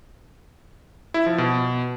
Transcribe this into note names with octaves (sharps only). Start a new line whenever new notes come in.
E4
F3
B2